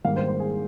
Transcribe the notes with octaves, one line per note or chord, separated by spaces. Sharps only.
G#1 G#2 D#3 G3 A#3 F5
C5
C5
G#4